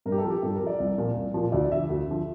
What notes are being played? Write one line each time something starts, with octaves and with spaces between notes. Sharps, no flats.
G2 A#4
G4
A4
F3
G4
G2 A4
F3 A#4
D5
C2
A#2 F3
C2
A#2 F3
D2 D5
D3 F3 E5
D2
D3 F3